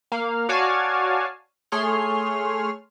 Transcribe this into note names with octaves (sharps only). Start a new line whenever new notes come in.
A#3 F5
F#4 C#5 D5 F5 G#5 A5
A3 G#4 C#5 C6 F6